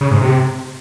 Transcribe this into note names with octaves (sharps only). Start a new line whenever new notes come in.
C#3
G#2
C3